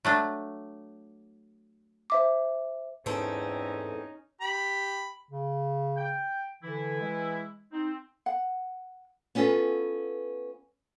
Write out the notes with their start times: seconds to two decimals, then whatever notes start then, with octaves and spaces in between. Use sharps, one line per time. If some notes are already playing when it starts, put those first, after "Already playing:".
0.05 F#3 A3 D4
2.10 C5 E5 D6
3.06 E2 G#2 C4 C#4 D#4 A4
4.41 G4 B5
5.31 C#3
5.97 G5
6.63 D3 E3 E4
7.01 G#3
7.72 C4 D#4
8.26 F#5
9.35 B3 C#4 F4 A4 B4